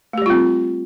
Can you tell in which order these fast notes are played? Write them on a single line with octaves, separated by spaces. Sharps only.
A3 G4 G3 F4 C4